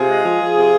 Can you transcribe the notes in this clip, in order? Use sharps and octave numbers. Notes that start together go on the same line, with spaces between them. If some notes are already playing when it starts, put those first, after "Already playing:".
Already playing: C3 F4 G#4
G#3
F3
F3
C3